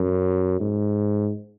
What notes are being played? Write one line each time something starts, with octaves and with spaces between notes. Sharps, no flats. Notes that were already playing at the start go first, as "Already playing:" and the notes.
Already playing: F#2
G#2